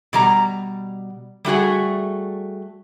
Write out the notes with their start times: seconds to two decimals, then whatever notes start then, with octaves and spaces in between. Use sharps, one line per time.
0.13 B2 G3 A#5
1.45 G3 A3 F#4 G#4